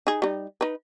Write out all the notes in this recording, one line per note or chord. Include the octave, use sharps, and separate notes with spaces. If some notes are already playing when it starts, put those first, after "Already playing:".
D#4 G#4
G3 D#4
D#4 B4